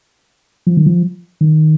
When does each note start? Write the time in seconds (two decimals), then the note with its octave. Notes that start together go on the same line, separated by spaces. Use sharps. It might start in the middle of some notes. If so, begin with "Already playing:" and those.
0.67 F3
0.77 D#3
0.86 F3
1.41 D#3